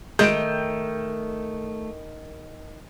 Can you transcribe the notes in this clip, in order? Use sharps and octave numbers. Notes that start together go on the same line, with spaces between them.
D#3 G#3 A3 G#4 G6 D7